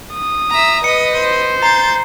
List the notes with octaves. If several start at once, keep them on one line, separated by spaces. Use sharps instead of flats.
D#6
E5 A#5
B4 D#5 C#7
C5
A#5 G6 A6 C7